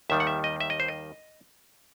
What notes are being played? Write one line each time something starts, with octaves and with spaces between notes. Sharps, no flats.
D#2 D#3 G3 E5
F#5
E5
D#5
E5
D#5
C5
D#5